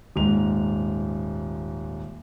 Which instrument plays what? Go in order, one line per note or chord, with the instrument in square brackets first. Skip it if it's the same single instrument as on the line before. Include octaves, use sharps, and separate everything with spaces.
[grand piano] D#1 G#2 F7